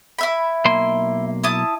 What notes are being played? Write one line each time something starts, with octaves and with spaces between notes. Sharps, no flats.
E4 E5 B5
B1 A#3 C6
E4 A5 D#6